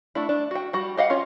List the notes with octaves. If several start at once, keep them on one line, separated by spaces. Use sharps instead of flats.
A3 D4 E4
D4
F#4 G5
G3 F#4
G4 D#5 F5 F#5
C#4 F4 C#5